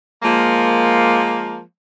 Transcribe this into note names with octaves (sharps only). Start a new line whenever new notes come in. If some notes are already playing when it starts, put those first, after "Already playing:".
F3 G#3 A#3